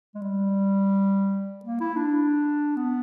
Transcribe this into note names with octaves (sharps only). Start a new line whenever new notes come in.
G#3
G3
A#3
E4
D4
B3